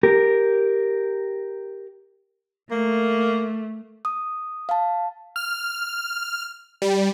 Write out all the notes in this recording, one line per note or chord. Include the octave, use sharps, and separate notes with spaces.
G4 A#4
A3 A#3
D#6
F5 A5
F6
G3